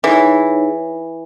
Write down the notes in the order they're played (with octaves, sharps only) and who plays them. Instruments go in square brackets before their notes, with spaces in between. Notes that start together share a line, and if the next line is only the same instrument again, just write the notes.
[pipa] E3 [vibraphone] D#4 G#4 C#5